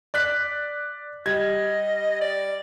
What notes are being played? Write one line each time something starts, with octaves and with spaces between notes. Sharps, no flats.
D5 F#6 B6
G3 D#5 G#6
D5